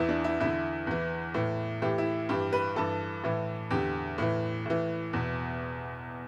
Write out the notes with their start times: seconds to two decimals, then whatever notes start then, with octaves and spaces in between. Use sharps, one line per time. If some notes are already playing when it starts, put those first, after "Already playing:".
Already playing: E2 E3 E4
0.09 D4
0.24 E4
0.40 E2 D3 E4
0.87 E2 E3
1.34 A2 E3
1.82 A2 E3 G4
1.98 E4
2.29 G2 E3 G4
2.53 B4
2.76 G2 E3 A4
3.24 A2 E3
3.71 E2 D3 G4
4.18 A2 E3
4.66 A2 E3
5.13 E2 B2